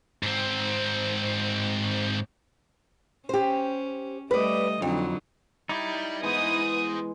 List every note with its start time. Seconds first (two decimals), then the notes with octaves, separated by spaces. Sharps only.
0.23 G#2 C4
3.29 C#4 G4 C5
4.31 G3 A3 B4 D5 D#5
4.82 F2 D3 F#3 D#4
5.69 G3 D#4 E4 D5
6.23 E3 G#3 B3 G#4 C5 D#6